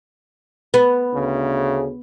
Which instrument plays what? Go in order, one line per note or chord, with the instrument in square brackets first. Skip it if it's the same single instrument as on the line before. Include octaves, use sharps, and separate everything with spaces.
[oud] B3
[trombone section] D2 C#3